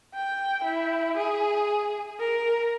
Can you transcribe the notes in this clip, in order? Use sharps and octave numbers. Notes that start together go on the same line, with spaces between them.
G5
E4
G#4
A#4